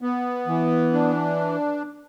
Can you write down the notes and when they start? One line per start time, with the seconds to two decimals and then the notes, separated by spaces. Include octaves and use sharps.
0.02 B3
0.47 E3
0.93 D4